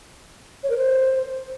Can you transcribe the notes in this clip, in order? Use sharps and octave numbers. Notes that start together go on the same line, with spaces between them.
C#5
A#4
C5